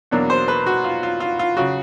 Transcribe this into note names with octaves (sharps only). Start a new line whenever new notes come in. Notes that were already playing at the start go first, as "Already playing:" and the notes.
E2 B2 F#3 A#3 D4
C5
B4
F#4
F4
F4
F4
F4
C#3 F#3 F#4